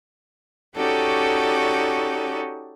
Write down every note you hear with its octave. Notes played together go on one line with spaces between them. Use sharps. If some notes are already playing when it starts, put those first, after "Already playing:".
C#4 D#4 F#4 G4 A4 D5